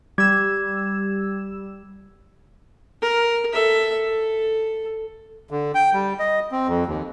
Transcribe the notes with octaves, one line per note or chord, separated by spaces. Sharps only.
G3 G4 E6 G#6
A#4
A4 E5
A4
D3
G5
G3
D#5
C4
F2
D#2